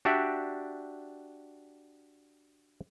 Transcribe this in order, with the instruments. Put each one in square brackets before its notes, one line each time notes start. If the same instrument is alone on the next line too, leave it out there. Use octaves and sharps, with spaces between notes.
[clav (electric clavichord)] D4 F#4 G4 D5 E5